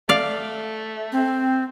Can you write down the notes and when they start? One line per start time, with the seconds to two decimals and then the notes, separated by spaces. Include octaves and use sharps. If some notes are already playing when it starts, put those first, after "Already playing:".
0.09 A3 D5 F5
1.12 C4